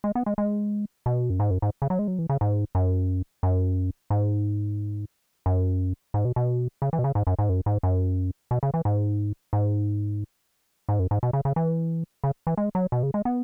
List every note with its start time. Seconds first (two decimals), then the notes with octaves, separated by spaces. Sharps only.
0.04 G#3
0.15 B3
0.26 G#3
0.38 G#3
1.06 B2
1.30 F#2
1.40 G#2
1.51 F#2
1.62 G#2
1.82 C#3
1.90 F#3
1.99 G#3
2.08 F#3
2.19 E3
2.30 C#3
2.41 G#2
2.75 F#2
3.43 F#2
4.10 G#2
5.46 F#2
6.14 G#2
6.25 B2
6.36 B2
6.82 C#3
6.93 E3
6.99 B2
7.04 C#3
7.15 G#2
7.27 F#2
7.39 G#2
7.49 F#2
7.66 G#2
7.83 F#2
8.51 B2
8.63 C#3
8.74 E3
8.85 G#2
9.53 G#2
10.89 G#2
10.99 F#2
11.11 G#2
11.23 B2
11.33 C#3
11.45 C#3
11.56 E3
12.24 C#3
12.47 E3
12.58 G#3
12.75 F#3
12.92 B2
13.03 C#3
13.14 G#3
13.25 B3